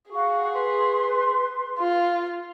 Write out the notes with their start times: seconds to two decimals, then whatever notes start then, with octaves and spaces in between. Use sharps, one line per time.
0.11 F#4 G#4 F5 C#6
0.53 B4 C6
1.79 F4